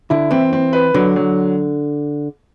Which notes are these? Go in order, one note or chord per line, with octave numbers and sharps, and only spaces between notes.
D3 E4
E3 C4
C4
B4
D3 F#3
F#3